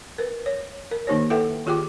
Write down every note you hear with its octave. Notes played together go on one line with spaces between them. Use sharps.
A#4 B4
C#5
A#4
D#3 A#3 D#4 G4 C5 C#5
E4 A4 B4 E5 F#5 G5
D#3 F4 G4 G#4 G5 D6